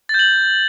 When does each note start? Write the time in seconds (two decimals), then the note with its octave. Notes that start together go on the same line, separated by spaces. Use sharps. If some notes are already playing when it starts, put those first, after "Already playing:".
0.09 A6
0.14 G6
0.19 F#7